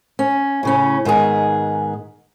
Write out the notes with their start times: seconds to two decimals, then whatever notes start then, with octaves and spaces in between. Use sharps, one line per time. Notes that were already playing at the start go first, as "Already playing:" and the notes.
0.19 C#4
0.63 A2 C#3 C#4
1.05 G#2 D#3 B3 G#4